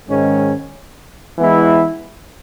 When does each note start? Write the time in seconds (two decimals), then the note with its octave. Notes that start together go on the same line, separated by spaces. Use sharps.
0.09 G#2 D#3 G#3 C#4
1.38 E3 G#3 B3 E4